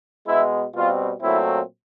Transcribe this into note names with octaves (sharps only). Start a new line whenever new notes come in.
B2 G#3 B3 E4
B2 G3 C4 F4
A#2 F#3 A3 C4 E4